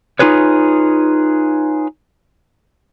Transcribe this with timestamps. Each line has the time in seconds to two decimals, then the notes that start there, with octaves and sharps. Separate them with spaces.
0.19 D#4 F4 G#4 B4 C#5